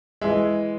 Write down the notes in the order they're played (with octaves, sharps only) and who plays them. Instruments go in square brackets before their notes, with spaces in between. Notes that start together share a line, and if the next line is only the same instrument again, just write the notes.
[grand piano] E3 G#3 E5